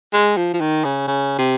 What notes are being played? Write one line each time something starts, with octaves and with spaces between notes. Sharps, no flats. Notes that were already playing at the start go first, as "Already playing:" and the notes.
G#3
F3
F3
D#3
C#3
C#3
C3